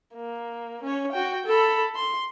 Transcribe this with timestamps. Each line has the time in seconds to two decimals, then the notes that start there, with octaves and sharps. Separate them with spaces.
0.14 A#3
0.83 C#4 C#5
1.12 F#4 G5
1.46 A4 B5
1.96 C6